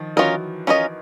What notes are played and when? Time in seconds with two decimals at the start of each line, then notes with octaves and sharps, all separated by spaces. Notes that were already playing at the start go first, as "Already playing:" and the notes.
Already playing: D#3 F3
0.16 E3 F#3 C#4 F4 A#4 D#5
0.67 C#4 F4 A#4 D#5